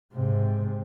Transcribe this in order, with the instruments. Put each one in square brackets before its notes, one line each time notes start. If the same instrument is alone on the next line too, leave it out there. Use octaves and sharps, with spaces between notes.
[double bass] G#2 C3